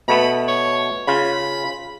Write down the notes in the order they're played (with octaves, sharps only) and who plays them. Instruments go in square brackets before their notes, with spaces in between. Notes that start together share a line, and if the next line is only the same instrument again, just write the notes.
[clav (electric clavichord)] B2 A3 B3 [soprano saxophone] B5
[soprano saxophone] C#5
[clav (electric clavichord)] C#3 F4 [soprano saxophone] B5